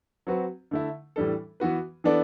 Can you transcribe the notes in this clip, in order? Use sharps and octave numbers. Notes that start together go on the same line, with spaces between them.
F#3 C4 F#4 B4
D3 A3 E4
A2 E3 G3 D4 A4
E3 B3 F#4 B4
E3 B3 D4 A4 D5